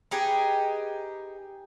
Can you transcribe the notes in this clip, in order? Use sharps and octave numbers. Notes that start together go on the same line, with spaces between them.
D#4 G4 G#4 B4